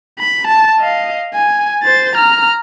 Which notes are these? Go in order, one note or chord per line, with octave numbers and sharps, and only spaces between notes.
B5
A5
D#5 F5
G#5
C5 A6
A#5 F6